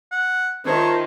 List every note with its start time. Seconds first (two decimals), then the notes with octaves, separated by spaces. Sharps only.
0.11 F#5
0.66 D#3 F4 C5 C#5 E5 A5